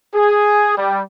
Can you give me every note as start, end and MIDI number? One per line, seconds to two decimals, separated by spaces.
0.14 0.74 68
0.76 1.00 55